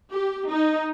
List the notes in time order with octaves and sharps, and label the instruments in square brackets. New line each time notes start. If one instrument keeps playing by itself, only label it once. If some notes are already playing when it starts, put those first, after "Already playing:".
[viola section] G4
D#4